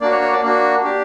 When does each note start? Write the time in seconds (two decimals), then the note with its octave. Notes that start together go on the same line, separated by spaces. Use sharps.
0.01 A#3 D4 F#4 D5
0.11 C#5
0.21 C#5
0.32 D5
0.42 A#3 D4 F#4
0.84 D4 G4